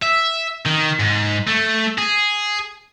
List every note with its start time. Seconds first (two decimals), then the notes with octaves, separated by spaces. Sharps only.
0.02 E5
0.66 D#3
1.00 G#2
1.47 A3
1.98 G#4